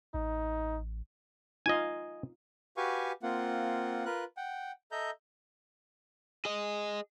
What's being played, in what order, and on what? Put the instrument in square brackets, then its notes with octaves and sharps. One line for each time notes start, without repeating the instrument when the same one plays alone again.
[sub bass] A1 [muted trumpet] D#4
[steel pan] D#4 F4 F5 [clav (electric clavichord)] D#5 G#5
[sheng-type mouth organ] F#4 G4 B4 F5 G#5 C#6
A#3 C4 F4 F#5
F4 A#4 B4 F#6
F#5 G5
A4 D#5 E5 A#5 G6
[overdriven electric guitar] G#4 D#5